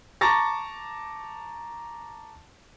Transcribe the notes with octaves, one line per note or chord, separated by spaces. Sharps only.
A5 A#5 C#6 D6 A6 A#6